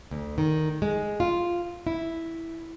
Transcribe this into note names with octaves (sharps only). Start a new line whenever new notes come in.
D2
D#3
G#3
F4
E4